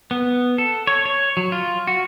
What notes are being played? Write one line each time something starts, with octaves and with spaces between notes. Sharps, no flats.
B3
A4
C#5
C#5
F#3
F4
F#4